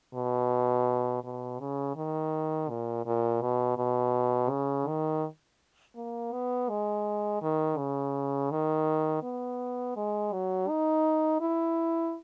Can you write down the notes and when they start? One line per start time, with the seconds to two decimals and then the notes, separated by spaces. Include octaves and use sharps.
0.14 B2
1.24 B2
1.60 C#3
1.96 D#3
2.69 A#2
3.06 A#2
3.41 B2
3.77 B2
4.50 C#3
4.88 D#3
5.96 A#3
6.33 B3
6.69 G#3
7.42 D#3
7.78 C#3
8.51 D#3
9.23 B3
9.97 G#3
10.33 F#3
10.69 D#4
11.41 E4